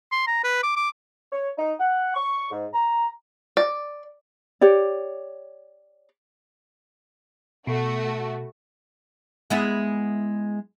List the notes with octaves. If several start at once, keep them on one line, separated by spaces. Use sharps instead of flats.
C6
A#5
B4
D6
D6
C#5
D#4
F#5
C#6
G#2
A#5
D5
G4 C#5 D5
B2 A3 F#4
G#3 B3 E4